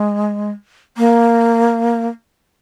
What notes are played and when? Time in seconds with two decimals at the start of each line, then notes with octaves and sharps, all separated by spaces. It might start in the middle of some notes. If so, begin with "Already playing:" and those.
Already playing: G#3
0.97 A#3